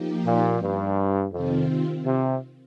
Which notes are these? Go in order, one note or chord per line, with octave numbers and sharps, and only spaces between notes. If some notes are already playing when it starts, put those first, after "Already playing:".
Already playing: F3 A#3 D#4 G4
A#2
G2
F2 C3 D#3 C4 F4
C3